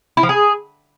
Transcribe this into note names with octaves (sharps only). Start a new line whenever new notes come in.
E4
F3
G#4